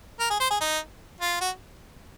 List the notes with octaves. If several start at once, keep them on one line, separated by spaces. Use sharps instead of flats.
A#4
G#4
C5
G#4
D#4
F4
F#4